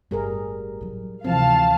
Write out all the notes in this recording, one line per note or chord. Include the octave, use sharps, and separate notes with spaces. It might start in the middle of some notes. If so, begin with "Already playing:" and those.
G1 A2 G3 G#4 A#4
A2 F#3
D2 C3 E3 F3 C4 F5 A5